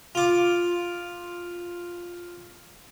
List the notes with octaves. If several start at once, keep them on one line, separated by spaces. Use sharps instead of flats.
F4 D6